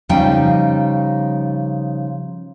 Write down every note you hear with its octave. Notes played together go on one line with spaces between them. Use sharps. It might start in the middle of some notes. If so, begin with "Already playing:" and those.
C#3 F3 G3 D#4 G5